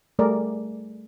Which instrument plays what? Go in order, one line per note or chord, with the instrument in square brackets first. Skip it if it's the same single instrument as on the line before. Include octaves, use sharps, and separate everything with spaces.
[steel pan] G3 A3 G#4 A#4 D5